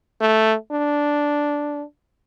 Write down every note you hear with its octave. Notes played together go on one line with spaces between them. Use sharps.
A3
D4